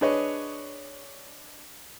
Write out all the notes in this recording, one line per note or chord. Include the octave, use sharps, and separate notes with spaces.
D4 G#4 B4 C#5 D#5